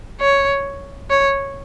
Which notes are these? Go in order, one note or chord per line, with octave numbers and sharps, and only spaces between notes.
C#5
C#5